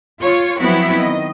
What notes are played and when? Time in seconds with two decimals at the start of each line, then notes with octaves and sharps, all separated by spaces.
0.21 F4 C#5
0.59 F3 F#3 B3 C4 E4 F#4
0.96 D#3 D#5